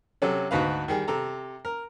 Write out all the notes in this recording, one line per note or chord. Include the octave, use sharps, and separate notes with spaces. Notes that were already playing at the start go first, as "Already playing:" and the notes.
C3 F#3 C#4 A4
D2 G#2 F#4 B4 F5
D#3 G3 G#4
C3 A4 A#5
A#4